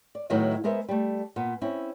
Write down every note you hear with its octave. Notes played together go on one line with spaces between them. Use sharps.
D5
A2 D#3 F#3 B3 E4 D#5
G#3 B3 A#4 C5 E5
G3 A3
A#2 B3
C4 C#4 E4